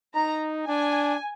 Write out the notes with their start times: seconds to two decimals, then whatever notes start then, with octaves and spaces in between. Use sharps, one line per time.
0.14 D#4 A#5
0.67 D4 G#5